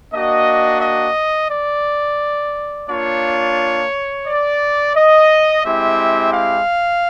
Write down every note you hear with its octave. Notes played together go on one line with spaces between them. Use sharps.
A#3 D4 F#4 D#5
D#5
D5
A#3 D4 F4 C#5
D5
D#5
G#3 C4 E4 G4 E5
F5